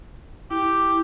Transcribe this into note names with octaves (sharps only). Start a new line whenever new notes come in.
E4 G4